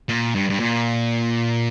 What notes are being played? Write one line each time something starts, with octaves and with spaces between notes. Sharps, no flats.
A#2
G2
G2
A#2